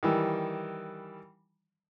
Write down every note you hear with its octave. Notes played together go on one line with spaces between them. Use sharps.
D#3 E3 G3